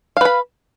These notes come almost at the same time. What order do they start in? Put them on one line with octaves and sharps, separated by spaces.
F5 B4 B5